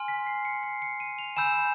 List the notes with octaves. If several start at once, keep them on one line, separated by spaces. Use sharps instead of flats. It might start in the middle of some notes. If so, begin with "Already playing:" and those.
Already playing: G#5 C6 F6
B6
C7
C#7
C7
C#7
D#7
F7
G#5 B5 E6 G6 E7